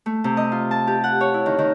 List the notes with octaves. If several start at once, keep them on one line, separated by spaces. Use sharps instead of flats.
A3
C3
D#5
F4
A5
G4
F#5
C#5
E4
D#3
D#3